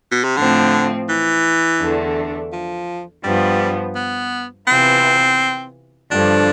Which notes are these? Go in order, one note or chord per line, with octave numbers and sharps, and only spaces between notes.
B2
C3
A2 D3 F3 C4
E3
E2 D3 A3 D4
F3
G2 F3 G3 B3
B3
C3 E3 B3 C4 F4
G2 D3 F3 D4